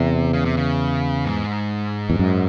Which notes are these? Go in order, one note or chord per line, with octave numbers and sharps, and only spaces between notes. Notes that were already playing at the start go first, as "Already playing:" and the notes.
Already playing: E2 C3
C#3
C3
C#3
G#2
E2
F#2